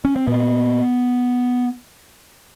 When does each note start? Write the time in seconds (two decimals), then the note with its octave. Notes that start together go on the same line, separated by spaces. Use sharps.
0.05 C#4
0.16 C4
0.27 A#2 B3